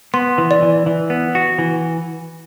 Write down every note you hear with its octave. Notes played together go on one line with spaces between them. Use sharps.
B3 C6
E3
D5
E3
E3
B3
F#4
E3